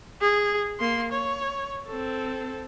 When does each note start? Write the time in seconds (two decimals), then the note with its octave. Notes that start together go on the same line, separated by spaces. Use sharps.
0.21 G#4
0.80 A#3 C6
1.12 C#5
1.88 C4 A4